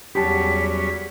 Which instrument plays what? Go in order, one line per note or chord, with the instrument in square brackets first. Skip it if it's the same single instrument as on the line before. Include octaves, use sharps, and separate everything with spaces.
[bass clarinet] E2 [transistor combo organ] F#3 G3 C#4 [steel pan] G4 A5 [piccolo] B6